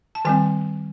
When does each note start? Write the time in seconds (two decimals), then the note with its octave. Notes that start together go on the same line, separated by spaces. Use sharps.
0.15 A5
0.25 D#3 G3 C4 G#5